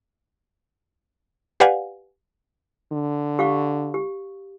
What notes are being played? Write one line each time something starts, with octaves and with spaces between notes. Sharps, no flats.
G4 B4 D5 F5 F#5 G#5
D3
G4 F5 C#6
G4